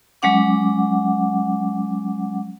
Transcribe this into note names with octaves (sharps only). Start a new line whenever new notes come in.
F#3 G#3 C#4 F#5 D6